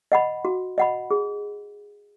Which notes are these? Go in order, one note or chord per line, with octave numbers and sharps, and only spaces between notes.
D#5 F#5 B5
F#4
D#5 F#5 B5
G#4